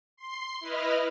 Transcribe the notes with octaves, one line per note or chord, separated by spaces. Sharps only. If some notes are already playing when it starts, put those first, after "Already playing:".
C6 C7
E4 B4 D#5 F6